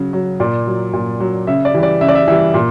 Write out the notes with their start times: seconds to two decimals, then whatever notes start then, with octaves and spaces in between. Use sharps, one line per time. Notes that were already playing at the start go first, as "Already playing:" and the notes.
Already playing: C#3 F#3
0.13 F#3
0.40 A#2 D5
0.67 F#3
0.93 A#2
1.20 F#3
1.47 C#3 E5
1.65 D5
1.74 E3 G3
1.83 D5
2.01 C#3 E5
2.08 D5
2.15 E5
2.28 E3 G3 E5
2.54 A#2